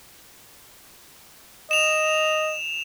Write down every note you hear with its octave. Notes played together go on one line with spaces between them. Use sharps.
D#5 E7 F7